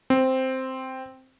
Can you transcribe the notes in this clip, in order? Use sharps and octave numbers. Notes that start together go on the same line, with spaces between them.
C4